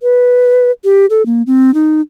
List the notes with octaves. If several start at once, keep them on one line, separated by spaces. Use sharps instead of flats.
B4
G4
A4
A#3
C4
D#4